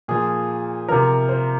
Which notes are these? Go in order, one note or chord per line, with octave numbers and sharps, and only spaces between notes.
A#2 F3 G#4
C3 F3 A#4
C5